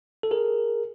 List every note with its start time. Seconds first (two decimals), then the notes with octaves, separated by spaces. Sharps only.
0.23 A4
0.31 G#4 A#4